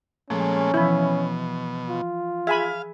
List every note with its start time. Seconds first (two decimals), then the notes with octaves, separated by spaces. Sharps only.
0.30 A#2 F3 G#3 A3 C#4
0.74 B2 E3 F3 E4
1.89 F4
2.47 G#4 E5 F5 G#5 B5